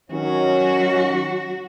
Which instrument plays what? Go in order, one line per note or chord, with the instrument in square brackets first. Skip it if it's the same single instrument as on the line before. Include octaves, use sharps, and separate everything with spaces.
[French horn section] D#3 C#4 [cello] F#3 F#4